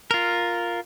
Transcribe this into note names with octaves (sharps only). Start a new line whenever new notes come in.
F4 A#4